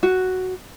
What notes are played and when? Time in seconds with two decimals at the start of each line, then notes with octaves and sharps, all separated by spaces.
0.03 F#4